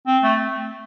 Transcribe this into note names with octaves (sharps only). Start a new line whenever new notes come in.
C4
A3